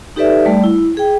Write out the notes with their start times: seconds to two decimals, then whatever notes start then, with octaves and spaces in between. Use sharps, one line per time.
0.16 D#4 G4 A4 B4 D5 E5
0.45 G3 A3 D5
0.64 E4
0.97 G#4 G5